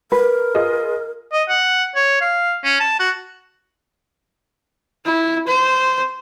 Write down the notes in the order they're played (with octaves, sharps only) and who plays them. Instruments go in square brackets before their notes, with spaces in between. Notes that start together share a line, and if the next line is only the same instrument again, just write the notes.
[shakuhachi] A#4 [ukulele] B4
[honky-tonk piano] F4 G#4 D#5
[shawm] D#5
F#5
C#5
F5
C#4
A5
F#4
[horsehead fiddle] E4
C5